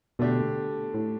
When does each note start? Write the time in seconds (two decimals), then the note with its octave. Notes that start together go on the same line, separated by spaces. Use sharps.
0.19 B2 D3 A3 D4 G4
0.94 A2